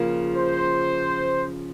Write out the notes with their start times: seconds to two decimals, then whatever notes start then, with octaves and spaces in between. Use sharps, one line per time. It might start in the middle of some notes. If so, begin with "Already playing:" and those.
Already playing: C#3 F3 A#3 F4
0.36 C5